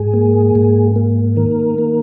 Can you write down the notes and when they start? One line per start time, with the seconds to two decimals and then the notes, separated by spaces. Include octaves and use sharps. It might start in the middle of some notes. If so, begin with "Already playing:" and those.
Already playing: G#2 G#4
0.14 A#3
0.55 G#2
0.96 A#3
1.36 D#3 A#4
1.78 A#3